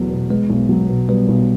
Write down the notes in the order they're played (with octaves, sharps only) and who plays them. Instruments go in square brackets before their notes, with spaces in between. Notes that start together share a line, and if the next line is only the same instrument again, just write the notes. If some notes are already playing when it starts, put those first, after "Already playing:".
Already playing: [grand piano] E2 B2 F#3 A3
B2
[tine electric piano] G#3 [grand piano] B3
[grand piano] B1
F#3
B2
[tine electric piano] G3 [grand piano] B3
[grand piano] B1